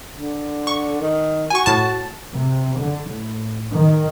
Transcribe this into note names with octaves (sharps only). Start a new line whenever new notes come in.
D3
C#6
D#3
F#4 G#5 C#6
A2 A5
C3
D3
A2
D#3